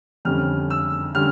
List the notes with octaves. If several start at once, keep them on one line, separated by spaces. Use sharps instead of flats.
F2 D3 G3 C#4 F6
E6
D3 G3 C#4 F6